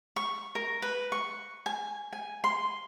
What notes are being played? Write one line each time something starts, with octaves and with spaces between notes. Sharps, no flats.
C#6
A#4
B4
C#6
G#5
G#5
C6